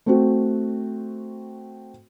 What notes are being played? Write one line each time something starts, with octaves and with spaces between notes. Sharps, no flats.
A3 C4 F#4